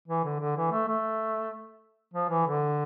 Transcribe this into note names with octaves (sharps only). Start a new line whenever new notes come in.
E3
D3
D3
E3
A3
A3
F3
E3
D3